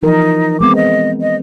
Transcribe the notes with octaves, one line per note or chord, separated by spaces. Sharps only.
E3 F3 D#4 A#4
G#3 B3 C4 D6
D#5
D#5